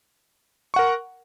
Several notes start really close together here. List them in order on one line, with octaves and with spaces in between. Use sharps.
C#6 F#5 A#4